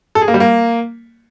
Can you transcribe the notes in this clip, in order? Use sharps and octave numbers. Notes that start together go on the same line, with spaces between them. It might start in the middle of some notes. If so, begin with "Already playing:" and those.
A4
G#4
A#3
G3
A#3